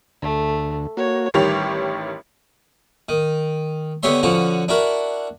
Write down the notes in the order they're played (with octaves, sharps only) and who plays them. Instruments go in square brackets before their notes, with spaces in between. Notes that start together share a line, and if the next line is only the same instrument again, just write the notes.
[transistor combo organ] D2 [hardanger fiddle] A3
[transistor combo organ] A#3 F#4 [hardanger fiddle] C#5
[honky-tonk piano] A1 D#3 G3 G4 C#5 F7
[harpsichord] D#3
D3 B3 G4 C#5 E5 C6
D3 F3 C#4 F#4
D4 E4 F#4 A#4